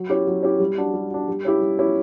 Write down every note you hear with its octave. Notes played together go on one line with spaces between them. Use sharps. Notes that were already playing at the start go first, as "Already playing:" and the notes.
Already playing: F#3
C#4 E4 G4
F#3
C#4 E4 G4
G3
D4 F#4
G3
D4 F#4
G3
C#4 E4 G4
G3
C#4 E4 G4